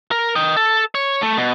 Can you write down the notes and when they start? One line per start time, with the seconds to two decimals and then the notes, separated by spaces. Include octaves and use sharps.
0.11 A#4
0.36 D#5 G5
0.57 A4
0.95 C#5
1.22 A3
1.37 B2